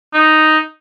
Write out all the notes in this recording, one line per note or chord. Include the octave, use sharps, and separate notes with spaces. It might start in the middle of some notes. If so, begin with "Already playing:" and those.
D#4